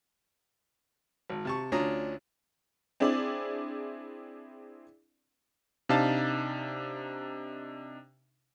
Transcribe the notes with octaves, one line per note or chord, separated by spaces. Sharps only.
G#1
C3 A5 C#6
D2 C#4 D4 F4 A#5 D#6
C4 D4 E4 G#4 D5
C3 D4 D#4 F5 A5 A6